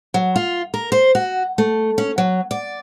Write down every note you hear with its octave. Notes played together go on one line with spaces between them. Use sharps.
F#3
F4
A#4
C5
F#4
A3
C#4
F#3
D5